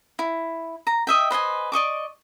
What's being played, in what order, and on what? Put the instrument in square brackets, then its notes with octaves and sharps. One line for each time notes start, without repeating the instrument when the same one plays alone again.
[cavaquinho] E4
A#5
D#5 E5 G5
B4 C5 D#5 G#5
D5 D#5 C#6 D6